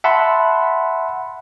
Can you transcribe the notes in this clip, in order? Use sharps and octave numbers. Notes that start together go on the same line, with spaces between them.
E5 F#5 A5 B5 C6